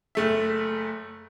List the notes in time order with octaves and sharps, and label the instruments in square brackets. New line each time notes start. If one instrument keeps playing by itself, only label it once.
[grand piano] F#1 A3 E5